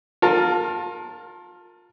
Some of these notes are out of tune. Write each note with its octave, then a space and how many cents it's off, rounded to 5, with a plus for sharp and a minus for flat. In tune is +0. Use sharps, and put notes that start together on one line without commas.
F4 +30 A#4 -10 A5 +0